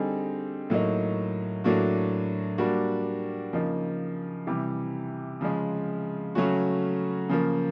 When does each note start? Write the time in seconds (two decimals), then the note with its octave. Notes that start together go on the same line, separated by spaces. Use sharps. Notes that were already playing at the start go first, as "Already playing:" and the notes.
Already playing: D3 G3 C4 D#4 G#4
0.70 A2 F#3 A#3 D#4
1.64 A2 F#3 A#3 D4 F#4
2.58 G3 A#3 D4 F#4
3.53 C#3 F3 A#3 D#4
4.47 C3 E3 G3
5.41 C#3 F3 G#3
6.35 C#3 F#3 A3 C#4 F#4
7.29 C#3 F3 A#3